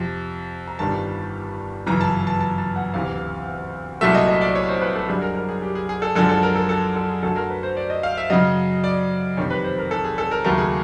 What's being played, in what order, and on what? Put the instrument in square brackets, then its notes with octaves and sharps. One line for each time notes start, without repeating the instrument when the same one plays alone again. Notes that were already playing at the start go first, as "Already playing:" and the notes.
Already playing: [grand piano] F2 C3 F3
A#5
G1 G2 D#3 G3 A5
G1 F#2 C#3 E3 A#5
A5
A5
A5
A5
F#5
D2 C3 E3 F5
C2 A#2 F#3 A3 E5
D#5
D#5
D5
C#5
C5
B4
A4
F#2 D3 G3 G#4
A#4
A#4
G#4
G4
G#4
G#4
A4
F#2 D3 F3 G#3 A4
A4
A#4
A4
A4
A4
G#4
F#2 D3 F#3 A3 A4
A#4
B4
C5
D5
D#5
F5
E5
F#2 C#3 F#3 D#5
D5
F2 C3 D#3 G3 C#5
B4
C5
A#4
A4
G#4
A4
A#4
D#2 C#3 F#3 A3 A#4
G#4